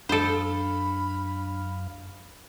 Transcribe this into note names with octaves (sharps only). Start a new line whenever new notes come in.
F#2 D4 A4 C5 F5 B5